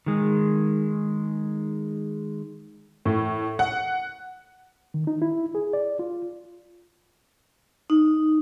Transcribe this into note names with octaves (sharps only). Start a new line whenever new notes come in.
D#3 G#3
A2
F#5
D#3
D#4
E4
G#4
D5
F4
D#4